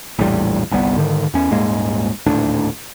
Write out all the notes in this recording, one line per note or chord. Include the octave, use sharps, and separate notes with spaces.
A#1 E2 A2 G3
G1 C2 G3 B3
G#2 D3 D#3
E2 C#4
D#1 G#2 G#3 A#3
D#1 D2 A2 D4